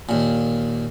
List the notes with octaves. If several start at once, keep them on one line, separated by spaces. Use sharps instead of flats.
D#2 A#2